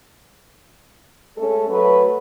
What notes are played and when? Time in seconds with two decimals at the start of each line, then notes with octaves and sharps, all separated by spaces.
1.37 G#3 A3 C#4 A4
1.69 F#3 A3 F#4 A4 B4